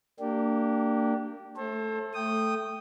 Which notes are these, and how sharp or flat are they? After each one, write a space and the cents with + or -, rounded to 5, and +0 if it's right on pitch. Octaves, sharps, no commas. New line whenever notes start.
A#3 -30 D4 +0 G4 -20
A3 +0 A4 +0 C5 +35
A3 +0 G5 -5 D#6 -10